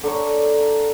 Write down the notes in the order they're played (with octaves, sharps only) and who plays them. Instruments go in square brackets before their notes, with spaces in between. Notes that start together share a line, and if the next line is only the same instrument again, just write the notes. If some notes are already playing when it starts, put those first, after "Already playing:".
[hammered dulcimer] D3 A#4 C#5